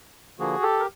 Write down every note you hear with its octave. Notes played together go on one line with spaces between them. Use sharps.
D3 F3 A#3 F#4 G#4
G4 A4
A#4